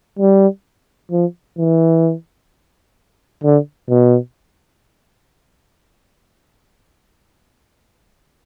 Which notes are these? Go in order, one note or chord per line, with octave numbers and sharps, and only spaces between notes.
G3
F3
E3
D3
B2